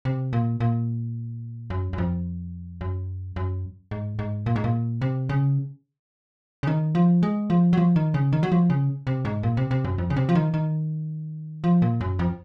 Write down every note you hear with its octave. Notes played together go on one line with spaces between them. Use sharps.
C3
A#2
A#2
F#2
F#2
F2
F#2
F#2
G#2
G#2
A#2
G#2
A#2
C3
C#3
C#3
D#3
F3
G#3
F3
F#3
F3
D#3
C#3
D#3
F#3
F3
C#3
C3
G#2
A#2
C3
C3
F#2
F2
C#3
C3
F3
D#3
D#3
F3
A#2
F#2
F2